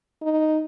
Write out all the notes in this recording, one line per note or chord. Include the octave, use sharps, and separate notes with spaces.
D#4